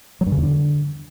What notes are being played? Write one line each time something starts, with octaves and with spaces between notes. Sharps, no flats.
F#3
G2
C#3
E2
D3